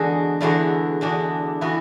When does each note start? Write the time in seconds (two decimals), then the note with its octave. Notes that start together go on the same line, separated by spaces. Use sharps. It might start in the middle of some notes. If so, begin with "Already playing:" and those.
Already playing: E2 D3 G#3 D4 F#4
0.41 E2 D3 G#3 D4 E4 F#4
1.01 E2 D3 G#3 D4 F#4
1.61 E3 B3 E4 F#4